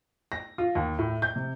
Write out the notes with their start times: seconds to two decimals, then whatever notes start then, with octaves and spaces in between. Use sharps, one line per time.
0.32 A#6
0.58 F4
0.75 D#2
0.99 A2
1.22 G6
1.36 C3